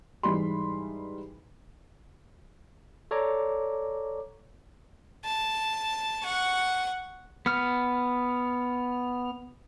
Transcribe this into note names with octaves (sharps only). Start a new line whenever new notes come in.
G#2 E3 G3 B5 C6
A4 C#5 D5 A#5 D6
A5
F#5 C#6
B3 F6